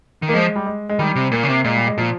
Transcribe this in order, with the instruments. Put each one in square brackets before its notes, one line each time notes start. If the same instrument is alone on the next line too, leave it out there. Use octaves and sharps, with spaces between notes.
[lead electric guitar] D#3
[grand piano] A#3
[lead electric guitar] F3 [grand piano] G#3
[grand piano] G3
G#3
G#3
[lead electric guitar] D#3 [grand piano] G3
[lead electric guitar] C3
[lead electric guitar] A#2 [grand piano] A#3
[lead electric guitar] C#3
C3
[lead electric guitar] A#2 [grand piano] G#3
[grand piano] G3
G#3
[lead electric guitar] A#2 [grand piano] F3